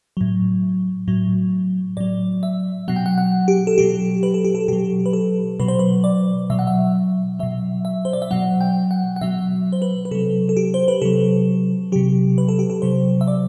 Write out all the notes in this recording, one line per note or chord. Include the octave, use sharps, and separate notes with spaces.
A2 F#3
A2 F#3
A2 F#3 D5
E5
B2 F#3 F#5
G5
F#5
F#5
G4
A4
B2 F#3 G4
B4
A4
G4
A4
B2 F#3 G4
B4
A4
B2 F#3 B4
C5
B4
D5
B2 F#3 E5
F#5
E5
B2 F#3 E5
E5
C5
D5
E5
B2 F#3 F#5
G5
F#5
F#5
B2 F#3 E5
C5
B4
B4
C3 F#3 A4
A4
G4
C5
B4
C3 F#3 A4
C3 F#3 G4
B4
A4
G4
A4
C3 F#3 C5
E5
D5